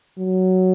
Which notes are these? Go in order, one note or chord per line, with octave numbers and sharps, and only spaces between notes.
F#3